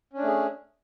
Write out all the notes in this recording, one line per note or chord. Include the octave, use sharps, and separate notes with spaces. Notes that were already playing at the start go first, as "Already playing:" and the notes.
A3 C#4 D4 G#4